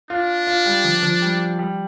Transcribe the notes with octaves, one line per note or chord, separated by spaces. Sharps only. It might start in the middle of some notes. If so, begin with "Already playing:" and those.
D4 F4
F4
G3
F3
F3
G3
G3